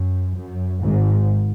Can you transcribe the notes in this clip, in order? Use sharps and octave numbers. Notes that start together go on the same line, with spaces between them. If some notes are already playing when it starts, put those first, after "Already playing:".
Already playing: F#2
F#2
G#1 G#2